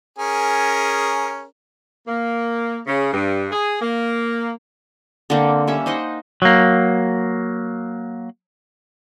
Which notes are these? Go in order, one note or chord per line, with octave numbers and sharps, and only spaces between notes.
C#4 G#4 A#4
A#3
C#3
G2
G#4
A#3
D3 A#3 C4
G3 C#4 E5
D#4 C5 D#5 F#5
F#3 A#3